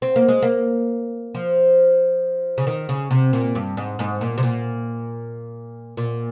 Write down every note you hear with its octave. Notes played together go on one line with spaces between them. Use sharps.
C4
A#3
G#3
A#3
F3
C#3
D#3
C#3
C3
A#2
G2
G#2
G#2
A#2
C3
A#2
A#2